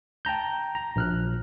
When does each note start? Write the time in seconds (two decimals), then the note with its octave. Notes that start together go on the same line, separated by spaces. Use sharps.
0.25 G5 A5 A#5 G6
0.75 A#5
0.96 A#1 F6 F#6